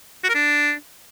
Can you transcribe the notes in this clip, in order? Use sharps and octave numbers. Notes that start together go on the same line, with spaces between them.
F#4
A#4
D4